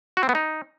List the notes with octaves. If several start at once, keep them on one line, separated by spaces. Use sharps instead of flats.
F#4
C4
B3
D#4